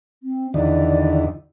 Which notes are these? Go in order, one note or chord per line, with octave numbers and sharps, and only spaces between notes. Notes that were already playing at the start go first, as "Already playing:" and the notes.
C4
E2 D3 D#3 D5